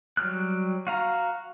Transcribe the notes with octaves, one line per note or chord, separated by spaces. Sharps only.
F#3 G3 F6 F#6
F#4 F5 A#5